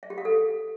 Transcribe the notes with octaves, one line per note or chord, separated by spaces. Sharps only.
E5
G4
F5
A4